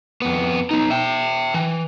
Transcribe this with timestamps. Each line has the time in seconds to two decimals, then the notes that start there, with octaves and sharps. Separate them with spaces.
0.22 F2 B3
0.71 B3 D#4
0.90 E5 G5
1.54 E3